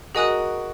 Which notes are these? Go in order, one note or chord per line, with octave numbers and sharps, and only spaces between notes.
F#4 G#4 A#4 D#5 G#5 D#6 F#6